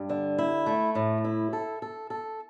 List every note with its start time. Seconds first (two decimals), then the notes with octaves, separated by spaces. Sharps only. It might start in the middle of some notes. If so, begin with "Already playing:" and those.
Already playing: G2
0.10 D3
0.38 E4
0.66 A3
0.95 A2
1.24 E4
1.53 A4
1.82 A4
2.10 A4